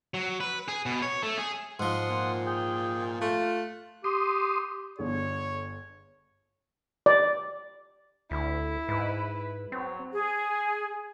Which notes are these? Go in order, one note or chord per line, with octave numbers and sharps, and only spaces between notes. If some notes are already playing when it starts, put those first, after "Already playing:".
F#3
B4
G#4
B2
C#5
A3
G#4
G#2 F3 F#5 C6 D#6
A#2
G#4 G5
A3 F4 F#6
G4 C6 D#6
G1 D3 G#4 C#5
D5
D2 E4
G#2 B4
F#3 C4
G#4